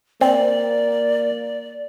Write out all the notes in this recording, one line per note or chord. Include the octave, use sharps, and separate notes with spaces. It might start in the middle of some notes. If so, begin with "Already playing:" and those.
A#3 C4 D5